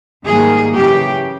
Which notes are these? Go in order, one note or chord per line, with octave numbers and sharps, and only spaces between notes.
G#2 D#3 G3 A#3 G#4
F#2 C#3 E3 G4